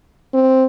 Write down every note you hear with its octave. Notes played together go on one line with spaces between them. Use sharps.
C4